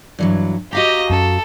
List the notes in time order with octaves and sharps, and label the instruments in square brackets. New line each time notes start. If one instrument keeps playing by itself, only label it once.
[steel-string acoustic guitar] G2 E3 F#3
[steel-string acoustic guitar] F#4 F5 A#5 [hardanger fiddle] G4 D#5
[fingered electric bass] F#2 C#4 [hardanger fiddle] A4